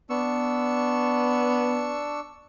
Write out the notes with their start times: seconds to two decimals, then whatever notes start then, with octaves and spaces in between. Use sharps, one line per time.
0.10 B3 D4 C#6 E6